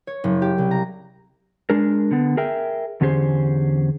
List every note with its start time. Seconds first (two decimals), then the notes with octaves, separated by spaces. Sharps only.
0.07 C#5
0.24 F#1
0.42 G4
0.58 C2
0.71 A#5
1.70 G#3 D4 G#4 A#4
2.11 D3 B3
2.37 G#4 A#4 E5 G5
3.01 E2 D3 C#4 G4 G#4 C5